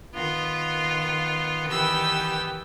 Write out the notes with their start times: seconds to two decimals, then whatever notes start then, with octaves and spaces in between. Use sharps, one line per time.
0.14 D#3 B3 F4
1.67 D#3 E3 G4 B4 E6